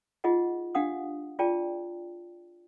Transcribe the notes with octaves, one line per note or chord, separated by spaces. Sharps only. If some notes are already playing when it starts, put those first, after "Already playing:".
D#4 F4 G#4 D#5 F#5
D4 G4 F5 F#5 D#6
F4 G#4 D5 G5 A5